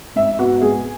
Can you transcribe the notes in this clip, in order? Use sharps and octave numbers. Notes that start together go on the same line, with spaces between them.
G#2 E5
B3 F#4
G#3 G#4